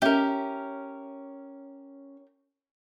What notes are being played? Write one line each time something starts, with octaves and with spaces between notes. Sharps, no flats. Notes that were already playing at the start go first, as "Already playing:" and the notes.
C#4 G4 A#4 E5